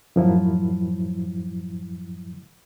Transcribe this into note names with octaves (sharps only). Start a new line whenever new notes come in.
F#2 A2 F3 F#3 E4